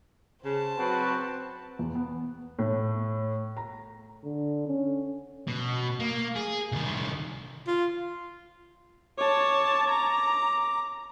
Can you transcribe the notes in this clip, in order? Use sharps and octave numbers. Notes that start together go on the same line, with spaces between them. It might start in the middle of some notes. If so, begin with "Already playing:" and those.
C#3 C5 A5
F#3 C4 F#4 B4
E2
B3
A2
A#5
D3
C#4
B2
A#3
G#4
C2 D#3
F4
C#5 A5 D6
A#5